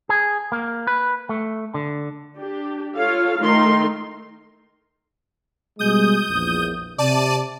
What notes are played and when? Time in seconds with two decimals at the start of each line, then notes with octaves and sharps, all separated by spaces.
0.09 G#4
0.52 A#3
0.87 B4
1.29 A3
1.74 D3
2.37 D4 G4
2.96 F4 A4 C#5 F5
3.41 D#3 A3 D#4 A#4 C6
5.79 B2 G3 G#3 D#6 G6
6.29 A#1 E2
6.98 C3 D5 A5 D#7